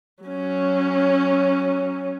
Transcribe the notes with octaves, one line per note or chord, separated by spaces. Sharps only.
F#3 C#4